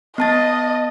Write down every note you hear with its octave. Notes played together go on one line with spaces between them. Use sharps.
B3 D#5 A5 A6